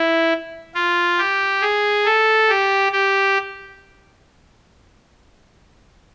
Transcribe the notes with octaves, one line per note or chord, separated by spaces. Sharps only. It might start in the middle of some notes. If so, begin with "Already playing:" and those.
Already playing: E4
F4
G4
G#4
A4
G4
G4